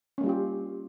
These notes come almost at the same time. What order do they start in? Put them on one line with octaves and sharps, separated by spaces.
C#4 A#3 G3 F4 G4